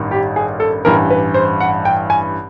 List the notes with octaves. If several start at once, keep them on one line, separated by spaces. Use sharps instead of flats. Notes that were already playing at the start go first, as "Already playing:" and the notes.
Already playing: A1 G2 D#3
G4
G#4
A4
A1 G2 E3 A#4
B4
C5
F#5
G5
G#5